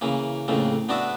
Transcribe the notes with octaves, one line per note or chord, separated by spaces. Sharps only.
C#3 E3 A#3
F2 A2 C#3 A#3
B3 D4 F#4 D5 E5